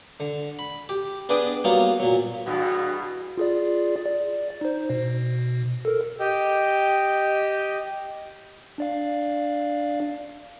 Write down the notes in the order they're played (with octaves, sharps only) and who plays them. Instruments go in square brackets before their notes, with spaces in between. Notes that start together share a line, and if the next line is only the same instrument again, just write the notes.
[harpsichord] D3
B5
G4
B3 D4 G#4 B4 D5 G5
F#3 G3 A#3 B3 F4 F5
A#2 F#3
[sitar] E2 G2 B2 [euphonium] F#4
[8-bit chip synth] F4 G#4 D5
D5
D#4 C5
B2
A4 A#4
[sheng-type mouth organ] G4 D#5 G5
[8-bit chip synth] D4 D5 F5